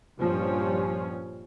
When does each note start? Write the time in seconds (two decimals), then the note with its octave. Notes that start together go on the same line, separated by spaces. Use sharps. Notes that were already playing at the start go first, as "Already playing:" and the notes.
0.19 A#1 G2 F3 G3 C#4